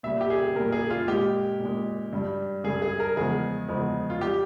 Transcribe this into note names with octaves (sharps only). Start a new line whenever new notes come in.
A#2 G3 E5
G4
G#4
A#2 G3 A#4
G#4
F4
A#2 G#3 G4
A#2
G#3
G2 G3
G2 G3 G#4
G#4
A#4
E2 C#3 F3 G#3 G#4
E2 C#3 F3 G#3
F4
G3 G4